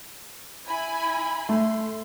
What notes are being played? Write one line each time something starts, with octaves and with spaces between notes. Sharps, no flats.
E4 G#5 B5
A3 C6